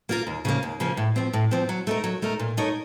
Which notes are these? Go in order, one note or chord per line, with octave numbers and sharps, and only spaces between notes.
A#3 F4 A#4
D#2
C#3 F3 A#3
D#2
C#3 F3 A#3
A2
F3 C4
A2
F3 C4
F#3
A3 D#4 A#4
F#3
A3 D#4 A#4
A#2
A3 D#4 A#4 C#5